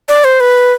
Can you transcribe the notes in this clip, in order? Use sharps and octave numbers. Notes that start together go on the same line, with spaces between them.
D5
C5
B4